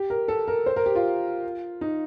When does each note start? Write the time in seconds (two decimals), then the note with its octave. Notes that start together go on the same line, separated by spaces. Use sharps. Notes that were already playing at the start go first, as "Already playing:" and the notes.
Already playing: G4
0.10 A#4
0.28 A4
0.48 A#4
0.66 C5
0.76 A#4
0.86 G4
0.95 F4
1.81 D#4